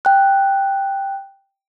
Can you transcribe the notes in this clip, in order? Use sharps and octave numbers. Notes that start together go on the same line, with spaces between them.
G5 F#6